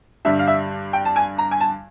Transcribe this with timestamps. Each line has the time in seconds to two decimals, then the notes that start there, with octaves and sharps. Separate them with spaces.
0.25 G2 D3 G3 E5
0.39 F5
0.47 E5
0.93 G5
1.05 A5
1.16 G#5
1.38 A#5
1.51 G#5
1.60 A5